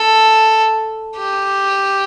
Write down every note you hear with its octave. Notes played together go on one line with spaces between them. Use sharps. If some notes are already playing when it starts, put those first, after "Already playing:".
Already playing: A4
G4